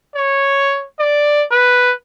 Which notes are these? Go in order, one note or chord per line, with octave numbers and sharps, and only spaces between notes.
C#5
D5
B4